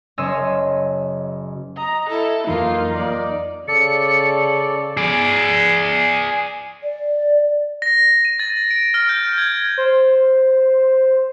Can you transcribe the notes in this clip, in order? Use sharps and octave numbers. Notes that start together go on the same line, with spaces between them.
F#1 C#4 C#5 D#5 C6 E6
D#5 A#5
E4 A4
F2 E3 F#3 A#3 D#4 F4
D5
C#3 A4 D5 C#7
G#4 D5
D5
A#6
D#7
A6
D7
F6
G6
G#6
C5